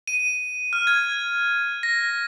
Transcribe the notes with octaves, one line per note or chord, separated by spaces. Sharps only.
D#7
F6
G#6
A#6